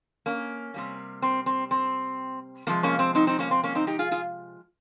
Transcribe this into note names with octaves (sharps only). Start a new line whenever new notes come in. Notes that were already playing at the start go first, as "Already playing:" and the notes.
A#3 C#4
C3 G3 A#3
C4
C4
C4
C3 F3 G#3 A#3
A#3 C#4
C4
C4 D#4
C4 D#4
A#3 C#4
C4
A#3 C#4
C4 D#4
D#4 G4
F4 G#4
F4 G#4